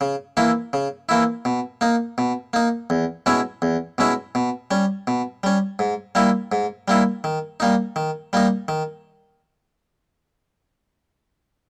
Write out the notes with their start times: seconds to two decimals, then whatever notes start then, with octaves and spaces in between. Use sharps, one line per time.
0.01 C#3
0.37 E3 A#3 E4
0.73 C#3
1.09 E3 A#3 E4
1.45 B2
1.81 A#3 D#4
2.18 B2
2.53 A#3 D#4
2.90 E2
3.26 B2 G#3 C#4 E4
3.62 E2
3.98 B2 G#3 C#4 E4
4.35 B2
4.71 G3 C#4
5.07 B2
5.43 G3 C#4
5.79 G#2
6.15 G3 A#3 E4
6.52 G#2
6.88 G3 A#3 E4
7.24 D#3
7.60 G3 A#3 D#4
7.96 D#3
8.33 G3 A#3 D#4
8.68 D#3